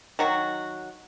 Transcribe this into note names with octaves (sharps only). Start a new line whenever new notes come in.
D#3 F#3 F#4